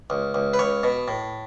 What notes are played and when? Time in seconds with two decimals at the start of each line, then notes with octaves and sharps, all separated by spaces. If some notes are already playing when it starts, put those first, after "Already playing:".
0.10 C#2
0.34 C#2
0.54 B4
0.59 C#2 C#5
0.83 B2
1.08 A2